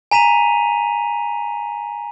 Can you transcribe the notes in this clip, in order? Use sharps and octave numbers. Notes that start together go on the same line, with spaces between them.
G#5 A#5 B6 D#7 F7